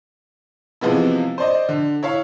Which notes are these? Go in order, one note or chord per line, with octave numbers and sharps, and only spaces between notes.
C3 E3 F3 G#3 B3 E4
C5 D5 D#5
D3
E4 C#5 F5